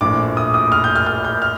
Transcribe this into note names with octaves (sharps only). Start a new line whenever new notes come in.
A#1 A2 F3 D6
D#6
D#6
F6
G6
F6
F6
G6
F6